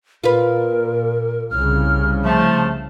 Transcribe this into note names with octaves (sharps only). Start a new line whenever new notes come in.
A#2 F4 A#4 B4
C2 C#3 F6
F3 A3 A5